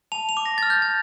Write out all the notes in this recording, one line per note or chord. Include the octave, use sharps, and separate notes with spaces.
A5 F7
F7
D6
A#6
F6 A6
G6
A6